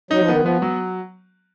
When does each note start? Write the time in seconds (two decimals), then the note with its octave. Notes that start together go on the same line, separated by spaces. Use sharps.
0.11 F#3 D#4
0.21 F3
0.28 D#3 B3
0.41 F3
0.46 B3
0.62 F#3